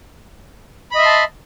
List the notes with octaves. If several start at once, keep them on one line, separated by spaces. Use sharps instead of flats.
D#5 E5 A5 B5 C6